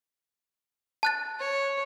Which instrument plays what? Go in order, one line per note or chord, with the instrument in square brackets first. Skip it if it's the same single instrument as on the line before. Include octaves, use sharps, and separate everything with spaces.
[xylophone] A5 F#6 A6
[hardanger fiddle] C#5